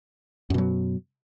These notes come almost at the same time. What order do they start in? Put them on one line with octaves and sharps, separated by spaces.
F#2 B2 F#3